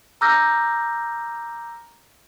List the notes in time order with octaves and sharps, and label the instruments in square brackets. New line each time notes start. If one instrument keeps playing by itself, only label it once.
[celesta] A#5 D6 E6 F6 G6 A#6